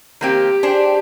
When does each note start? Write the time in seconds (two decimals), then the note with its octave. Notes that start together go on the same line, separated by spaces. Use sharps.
0.21 D#3 A#3 C4 G4
0.63 D4 G#4 C5